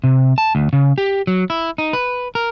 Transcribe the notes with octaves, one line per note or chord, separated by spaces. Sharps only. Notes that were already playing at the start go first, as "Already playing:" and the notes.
C3
A5
D2
C#3
G4
F#3
E4
D#4
B4
A#4